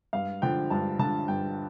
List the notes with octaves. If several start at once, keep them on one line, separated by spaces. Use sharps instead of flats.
G2 F5
D3 F3 G5
G2 A5
D3 F3 A5
G2 G5